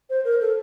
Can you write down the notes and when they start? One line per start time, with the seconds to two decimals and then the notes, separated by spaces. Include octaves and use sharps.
0.10 C5
0.25 A#4
0.41 A4